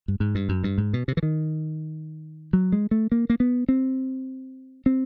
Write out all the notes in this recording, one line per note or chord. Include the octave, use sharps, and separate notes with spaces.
G2
G#2
G2
F#2
G2
G#2
B2
C3
E3
D#3
F#3
G#3
A3
A#3
A#3
B3
C4
C4